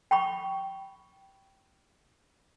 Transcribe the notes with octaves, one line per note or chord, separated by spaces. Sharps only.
G5 B5 C#6